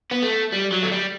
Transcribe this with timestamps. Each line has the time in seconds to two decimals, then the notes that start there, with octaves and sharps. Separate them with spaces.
0.11 B3
0.22 A3
0.52 G3
0.72 F#3
0.82 A3
0.91 G3